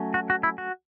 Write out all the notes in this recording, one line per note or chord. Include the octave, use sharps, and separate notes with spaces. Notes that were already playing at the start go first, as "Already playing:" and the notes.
Already playing: F#3 A3 C#4
F#4
F#4
E4
F#4